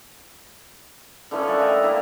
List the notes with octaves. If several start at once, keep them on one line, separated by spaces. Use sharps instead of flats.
D3 E3 F3 C#4
A#4 D5 E5 F#5
A2 D#5 F5 G5
A#3 D4 E4 A#4